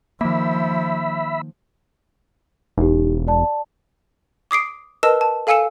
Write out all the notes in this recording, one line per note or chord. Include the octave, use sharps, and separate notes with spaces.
D#3 F3 A#3 E5 B5
E1 D#4 G4
D5 A5
D6 D#6 C7 D7
A#4 B4 D#5 A5 E6 E7
A5
A4 F5 G#5 E6 C#7 E7